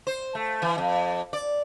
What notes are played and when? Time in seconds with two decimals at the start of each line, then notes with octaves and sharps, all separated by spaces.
0.07 C5
0.35 A3
0.62 E3
0.78 F2
1.33 D5